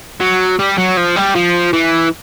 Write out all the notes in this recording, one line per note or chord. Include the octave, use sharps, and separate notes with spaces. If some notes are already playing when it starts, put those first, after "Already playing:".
F#3
G3
F#3
F3
G3
F3
E3